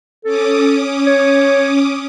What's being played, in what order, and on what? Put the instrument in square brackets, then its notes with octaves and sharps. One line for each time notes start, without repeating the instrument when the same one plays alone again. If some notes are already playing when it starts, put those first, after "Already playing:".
[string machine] C#4 D6 D#6 [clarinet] A4
[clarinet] C#5